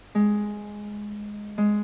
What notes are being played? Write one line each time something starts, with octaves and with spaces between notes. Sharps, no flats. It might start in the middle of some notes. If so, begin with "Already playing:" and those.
G#3
G#3